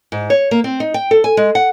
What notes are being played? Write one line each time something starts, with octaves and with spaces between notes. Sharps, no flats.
G#2
C#5
A#3
C4
D#4
G5
A4
G#5
G#3
F#5